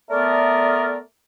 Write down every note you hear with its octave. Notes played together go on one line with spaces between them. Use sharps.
A3 B3 A#4 D5